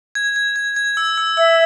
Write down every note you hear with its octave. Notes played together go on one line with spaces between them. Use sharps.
G#6
G#6
G#6
G#6
E6
E6
E5 E6